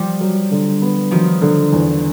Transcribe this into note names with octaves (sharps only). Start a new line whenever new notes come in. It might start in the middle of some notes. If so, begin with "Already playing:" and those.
Already playing: F3 G3
F#3
D3
B3
D#3 F3 F#3
D3
E2